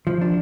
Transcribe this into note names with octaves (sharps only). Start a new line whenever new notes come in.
F3
D4